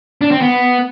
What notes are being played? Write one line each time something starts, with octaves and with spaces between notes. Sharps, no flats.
D4
C4
B3